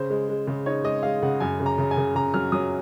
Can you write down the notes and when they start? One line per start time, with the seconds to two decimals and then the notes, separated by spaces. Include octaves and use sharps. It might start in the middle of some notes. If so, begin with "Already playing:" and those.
Already playing: C#3 C5
0.10 G#3
0.29 G#3
0.47 C#3
0.66 D#4 C#5
0.84 G#3 D#5
1.03 G#3 F5
1.22 C#3 F#5
1.40 F#2 G#5
1.60 C#3
1.66 A#5
1.78 C#3
1.91 G#5
1.97 C#3
2.15 C#3 A#5
2.34 F#3 F6
2.52 F#3 D#6